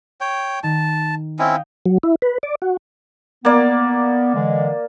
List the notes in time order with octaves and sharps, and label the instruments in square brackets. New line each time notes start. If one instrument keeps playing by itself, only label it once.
[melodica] C#5 G5
[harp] D#3 [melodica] A5
[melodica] C4 C#4 E4 [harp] D#5 F5 G5
[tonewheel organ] F#3
E4
B4
D5
F#4
[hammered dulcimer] A#3 D5 [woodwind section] B3
[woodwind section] D3 E3 G#3